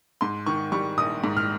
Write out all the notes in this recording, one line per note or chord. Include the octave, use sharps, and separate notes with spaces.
G#2 C6
D#3 C#6
G3 C#6
A#1 D#6
G#2
F6